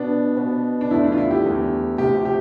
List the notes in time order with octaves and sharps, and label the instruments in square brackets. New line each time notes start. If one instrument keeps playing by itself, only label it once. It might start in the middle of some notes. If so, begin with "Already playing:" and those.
Already playing: [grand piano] B2 B3 D4
B2 B3
D4
E2 D3 A3 E4
D4
F4
E4
G4
E2 D3 A3
D2 C3 F3 G4
G4